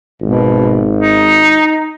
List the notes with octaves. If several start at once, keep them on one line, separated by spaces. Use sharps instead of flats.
G#1 B2
D#4